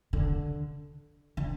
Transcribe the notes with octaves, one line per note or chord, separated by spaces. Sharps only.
D3
D3